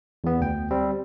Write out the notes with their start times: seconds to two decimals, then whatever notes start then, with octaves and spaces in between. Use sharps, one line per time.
0.24 E2 B3
0.40 D2 G5
0.71 G3 C4